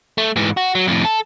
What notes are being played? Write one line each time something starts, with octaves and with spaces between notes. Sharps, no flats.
A3
G#2 E3
F#4
F#3
F2 A2
A4